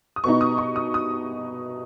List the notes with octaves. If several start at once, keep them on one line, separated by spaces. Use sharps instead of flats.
D#6
B2 B3 D#4 C#6
D#6
C#6
D#6
D#6